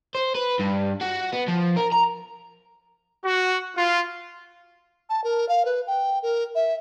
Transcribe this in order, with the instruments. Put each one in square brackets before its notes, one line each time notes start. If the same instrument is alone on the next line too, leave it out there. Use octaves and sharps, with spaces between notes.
[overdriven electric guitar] C5
B4
G2
F#4
B3
F3
A#4
A#5
[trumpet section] F#4
F4
[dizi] A5
A#4
F5
B4
G5
A#4
E5